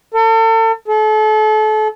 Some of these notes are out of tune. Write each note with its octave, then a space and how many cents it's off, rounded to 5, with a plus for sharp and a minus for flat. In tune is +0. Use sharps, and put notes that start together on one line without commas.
A4 +40
A4 -35